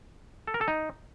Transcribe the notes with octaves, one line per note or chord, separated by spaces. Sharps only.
A4
A#4
A4
D#4